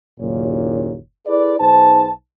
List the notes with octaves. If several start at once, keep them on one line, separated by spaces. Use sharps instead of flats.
F#1 D#2 A#2 C#5
E4 G#4 A4 B4 D5
B1 D#4 G#4 B4 C5 A5